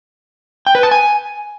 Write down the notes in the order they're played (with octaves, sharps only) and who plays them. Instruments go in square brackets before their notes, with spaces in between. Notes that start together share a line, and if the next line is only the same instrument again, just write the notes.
[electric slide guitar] G5
B4
A5
G#5